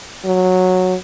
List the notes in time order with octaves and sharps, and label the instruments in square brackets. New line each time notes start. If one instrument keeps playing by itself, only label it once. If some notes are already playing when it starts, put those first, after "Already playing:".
[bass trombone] F#3